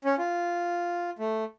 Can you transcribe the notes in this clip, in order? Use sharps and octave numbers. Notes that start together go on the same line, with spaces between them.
C#4
F4
A3